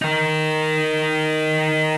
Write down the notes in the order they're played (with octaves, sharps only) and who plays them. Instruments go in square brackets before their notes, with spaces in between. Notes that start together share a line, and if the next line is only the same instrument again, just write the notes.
[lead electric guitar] D#4 A#4